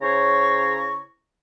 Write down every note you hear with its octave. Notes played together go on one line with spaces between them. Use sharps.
C#3 E4 C5 C#5 A#5 C#6